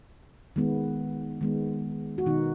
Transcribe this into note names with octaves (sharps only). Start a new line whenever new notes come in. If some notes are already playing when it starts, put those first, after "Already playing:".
D#3 G#3 B3
D#3 G#3 B3
F#4
B2 D#3 B3 D#4